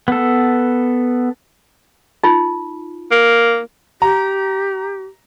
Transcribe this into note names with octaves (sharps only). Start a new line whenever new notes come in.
B3 A4
D#4 F4
A#3
G4 A#5